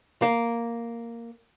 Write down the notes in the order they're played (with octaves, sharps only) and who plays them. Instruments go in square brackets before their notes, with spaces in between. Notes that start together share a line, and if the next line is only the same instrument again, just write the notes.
[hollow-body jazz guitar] A#3